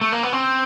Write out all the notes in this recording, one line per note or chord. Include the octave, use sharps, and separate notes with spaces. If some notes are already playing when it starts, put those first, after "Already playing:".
A3
A#3
B3
C4